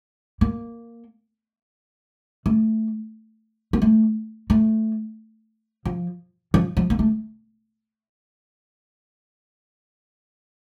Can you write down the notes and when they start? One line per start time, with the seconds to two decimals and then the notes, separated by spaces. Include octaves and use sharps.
0.41 A#3
2.46 A3
3.73 A#3
3.82 A3
4.50 A3
5.85 F3
6.54 F3
6.77 F3
6.90 A#3
6.99 A3